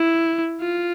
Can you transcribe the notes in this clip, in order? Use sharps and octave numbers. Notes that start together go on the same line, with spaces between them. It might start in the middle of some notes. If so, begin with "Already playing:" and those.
Already playing: E4
F4